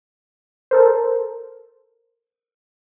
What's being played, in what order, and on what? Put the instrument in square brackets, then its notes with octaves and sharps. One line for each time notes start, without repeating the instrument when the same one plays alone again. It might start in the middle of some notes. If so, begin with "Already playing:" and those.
[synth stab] A4 A#4 C5